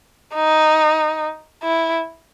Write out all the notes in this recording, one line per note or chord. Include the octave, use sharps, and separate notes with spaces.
D#4
E4